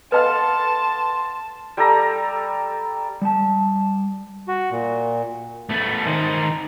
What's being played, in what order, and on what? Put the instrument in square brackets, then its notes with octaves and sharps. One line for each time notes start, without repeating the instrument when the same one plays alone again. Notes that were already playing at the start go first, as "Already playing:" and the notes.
[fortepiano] B3 A4 F5 [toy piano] B4 D#5 [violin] A5 [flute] C6
[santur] G3 A4 A#5
[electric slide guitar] G3 A5
[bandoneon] F#4
A#2
[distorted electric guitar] A3 B3
D#3 C5